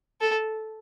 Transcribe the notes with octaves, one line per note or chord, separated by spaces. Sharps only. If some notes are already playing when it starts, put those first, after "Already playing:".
A4